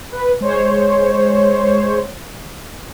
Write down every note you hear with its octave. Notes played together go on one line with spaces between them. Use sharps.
B4
G#3 C5 C#5